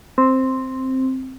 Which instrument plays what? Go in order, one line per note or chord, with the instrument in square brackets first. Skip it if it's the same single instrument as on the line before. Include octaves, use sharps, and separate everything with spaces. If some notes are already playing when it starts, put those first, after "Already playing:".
[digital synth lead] C4